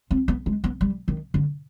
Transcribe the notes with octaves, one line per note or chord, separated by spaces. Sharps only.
C4
B3
G#3
B3
G3
D#3
D3